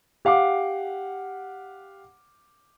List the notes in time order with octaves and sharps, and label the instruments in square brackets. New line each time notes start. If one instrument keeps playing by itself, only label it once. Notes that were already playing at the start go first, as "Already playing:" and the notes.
[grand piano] G4 F5 F#5 D6